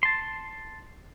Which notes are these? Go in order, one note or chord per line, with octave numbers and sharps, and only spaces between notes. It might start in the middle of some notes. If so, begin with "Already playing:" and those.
A5 C6